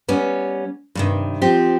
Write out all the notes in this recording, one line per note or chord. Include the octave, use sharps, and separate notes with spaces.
G3 B3 C#4
G2 C3 D#3
F3 C4 G4